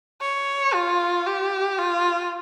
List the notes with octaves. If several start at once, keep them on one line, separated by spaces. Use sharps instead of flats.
C#5
F4
G4
F4